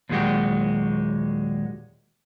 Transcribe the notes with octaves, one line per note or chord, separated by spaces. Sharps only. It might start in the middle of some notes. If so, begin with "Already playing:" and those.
D#2 A#2 F#3 G#3 F#4 G4